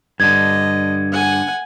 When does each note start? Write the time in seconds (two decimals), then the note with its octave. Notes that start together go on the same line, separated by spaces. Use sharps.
0.20 G2 D3 D#5 G#6
1.12 F#5 G#5